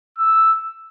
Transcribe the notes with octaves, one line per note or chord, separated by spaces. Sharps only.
E6